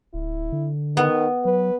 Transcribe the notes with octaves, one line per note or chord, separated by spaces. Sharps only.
D1 E4
D3
D#3 B3
F#3 B4